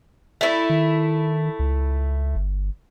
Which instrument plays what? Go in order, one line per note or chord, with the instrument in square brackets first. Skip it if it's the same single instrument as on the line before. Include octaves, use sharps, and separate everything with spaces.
[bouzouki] A3 E4
[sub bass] D#3
C#2
G1